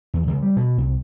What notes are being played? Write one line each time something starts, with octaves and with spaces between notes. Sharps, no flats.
E2
C#2
G3
B2
C2